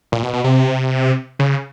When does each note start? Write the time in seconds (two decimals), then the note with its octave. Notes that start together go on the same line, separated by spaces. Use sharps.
0.12 A#2
0.23 B2
0.33 B2
0.44 C3
1.39 C#3